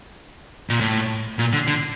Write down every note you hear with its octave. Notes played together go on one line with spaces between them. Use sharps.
A#2
A2
A#2
D3
D3